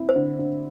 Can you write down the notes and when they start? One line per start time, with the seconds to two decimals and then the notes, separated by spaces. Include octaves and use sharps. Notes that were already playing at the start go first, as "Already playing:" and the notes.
Already playing: C4 E4
0.09 C5
0.16 D3
0.39 D3